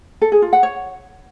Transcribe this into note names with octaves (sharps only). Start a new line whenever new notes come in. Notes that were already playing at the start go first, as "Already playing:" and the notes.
A4
G#4
F4
F#5
C#5